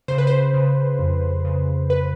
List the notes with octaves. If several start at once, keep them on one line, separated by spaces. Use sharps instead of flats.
C#3 C5
B4
C5
C#3
F2
C#3
B4